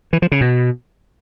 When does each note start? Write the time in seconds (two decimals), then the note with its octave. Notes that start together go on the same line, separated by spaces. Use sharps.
0.13 E3
0.22 F3
0.32 C#3
0.41 B2